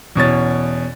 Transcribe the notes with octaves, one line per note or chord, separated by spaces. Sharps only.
E2 B2 C#4 A6